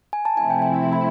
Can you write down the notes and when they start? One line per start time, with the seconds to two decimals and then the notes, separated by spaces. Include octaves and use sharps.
0.13 G#5
0.25 A5
0.37 C3 F3 A3 C4 E4 G#5
0.50 G5
0.62 G5
0.74 G5
0.93 B5